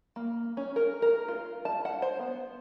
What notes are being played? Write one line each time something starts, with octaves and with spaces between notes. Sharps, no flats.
A#3
C#4
A#4
A#4
F4
A5
F#5
C5
B3